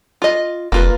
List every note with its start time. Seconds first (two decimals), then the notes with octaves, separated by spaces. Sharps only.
0.22 F4 D#5
0.72 F1 A#3 F4 B4